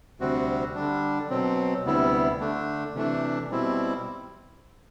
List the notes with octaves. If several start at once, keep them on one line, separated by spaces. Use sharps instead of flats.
D2 C3 G3 C4 F#4
D3 G3 D4
B2 F#3 C4
D2 C3 G3 B3 E4
D3 A3 D4
C3 E3 A3 D4
B2 G3 C4 E4